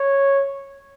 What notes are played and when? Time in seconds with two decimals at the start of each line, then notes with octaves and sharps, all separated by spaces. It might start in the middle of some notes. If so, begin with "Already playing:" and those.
Already playing: C#5